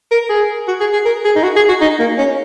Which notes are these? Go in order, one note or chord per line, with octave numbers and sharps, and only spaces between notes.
A#4
G#4
F#4
G#4
G#4
A#4
G#4
D#4
F#4
G#4
F#4
D#4
A#3
C#4